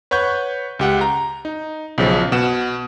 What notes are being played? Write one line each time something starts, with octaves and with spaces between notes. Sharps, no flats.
B4 C#5 F#5 C#6 G6
C#2 G4 F#5
A#5
D#4
B1 C#3 F3
B2 F#5 E7